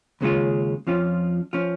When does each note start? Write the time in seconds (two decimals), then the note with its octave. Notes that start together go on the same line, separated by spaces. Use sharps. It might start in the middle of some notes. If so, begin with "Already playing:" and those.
0.21 D#2 C#3 G#3 C#4 F4
0.87 F2 F3 C#4 F4
1.53 F3 C#4 F4